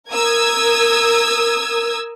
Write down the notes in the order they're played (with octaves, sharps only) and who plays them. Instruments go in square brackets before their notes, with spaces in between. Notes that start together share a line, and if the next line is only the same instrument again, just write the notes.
[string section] A#4 D#6 E6 G#6